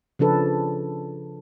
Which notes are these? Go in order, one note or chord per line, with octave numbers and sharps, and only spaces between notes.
C#3 F3 D4 A4 B4